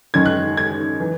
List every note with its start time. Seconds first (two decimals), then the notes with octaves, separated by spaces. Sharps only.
0.14 F#2 D#3 G#6
0.25 F#6
0.57 G#6
1.00 E3